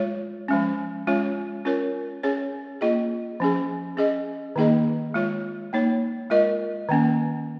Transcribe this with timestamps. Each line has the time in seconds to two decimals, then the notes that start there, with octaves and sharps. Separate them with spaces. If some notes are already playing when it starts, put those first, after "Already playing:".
Already playing: G#3 F4 C#5
0.48 F3 G#3 C#4
1.07 G#3 C#4 F4 C#5
1.65 C#4 F4 A#4 C#5
2.23 C#4 G#4 C#5
2.81 A#3 F4 G#4 D#5
3.40 F3 C#4 G#4
3.97 C#4 G#4 D#5
4.56 D#3 A#3 D#4 G#4 D#5
5.14 G#3 F4 C#5
5.73 A#3 D#4 C#5
6.30 G#3 F4 A#4 D#5
6.89 D#3 A#3 C#4